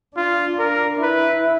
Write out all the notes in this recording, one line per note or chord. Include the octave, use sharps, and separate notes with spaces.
D4 F4
A#4
E4 B4